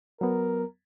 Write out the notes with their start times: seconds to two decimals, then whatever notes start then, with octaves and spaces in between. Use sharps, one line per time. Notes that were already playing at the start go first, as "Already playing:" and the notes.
0.21 F#3 B3 A#4